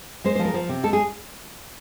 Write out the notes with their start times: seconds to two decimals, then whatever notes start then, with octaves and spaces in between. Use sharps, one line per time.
0.24 G#3 C5
0.35 C5
0.39 F3
0.45 A#4
0.54 F3
0.69 C3
0.84 G#3 A4
0.93 G#4